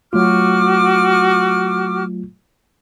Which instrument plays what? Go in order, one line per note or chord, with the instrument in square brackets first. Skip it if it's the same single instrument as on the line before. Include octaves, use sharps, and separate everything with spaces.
[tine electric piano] F#3 A3 F4 [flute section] F#4 D6 F6